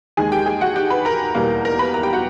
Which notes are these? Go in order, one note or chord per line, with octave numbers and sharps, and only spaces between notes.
D#2 D#3 G#3 G#4 G#5
G4 G5
G#4 G#5
F#4 F#5
G4 G5
B4 B5
A#4 A#5
E2 B2 G3 A#3
A#4 A#5
B4 B5
A#4 A#5
G4 G5
F#4 F#5